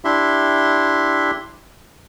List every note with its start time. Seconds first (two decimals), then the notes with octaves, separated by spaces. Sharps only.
0.05 D4 E4 G4 E5 C6